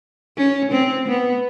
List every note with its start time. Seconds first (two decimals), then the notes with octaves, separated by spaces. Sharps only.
0.38 C#4
0.72 C4
1.08 B3